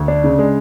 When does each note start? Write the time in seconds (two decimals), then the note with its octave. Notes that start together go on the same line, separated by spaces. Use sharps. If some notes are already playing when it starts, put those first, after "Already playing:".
Already playing: D2
0.08 D4
0.24 C#3
0.39 G#3